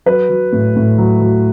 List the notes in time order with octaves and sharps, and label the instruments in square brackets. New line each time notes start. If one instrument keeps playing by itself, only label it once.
[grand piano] F#3 B4
F#3
A2
A2
F#3
F#3